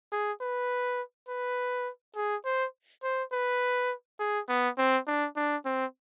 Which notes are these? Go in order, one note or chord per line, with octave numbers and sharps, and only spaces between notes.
G#4
B4
B4
G#4
C5
C5
B4
G#4
B3
C4
D4
D4
C4